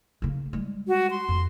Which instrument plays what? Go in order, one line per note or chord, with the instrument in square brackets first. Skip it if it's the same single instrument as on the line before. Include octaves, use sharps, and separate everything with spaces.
[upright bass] C#3 A#3
G3 G#3
[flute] F#4
C6
[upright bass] F2